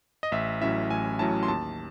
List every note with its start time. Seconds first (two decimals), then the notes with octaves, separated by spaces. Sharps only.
0.23 D#5
0.32 A1 E5
0.61 A2 F#3 C#4 E4 E5
0.90 A1 G#5
1.19 A2 F#3 C#4 E4 A5
1.43 C6
1.48 D#2 A5